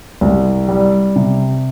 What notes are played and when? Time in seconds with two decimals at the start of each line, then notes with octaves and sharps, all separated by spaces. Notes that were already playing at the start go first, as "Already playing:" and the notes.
0.21 C2
0.69 G3
1.16 C3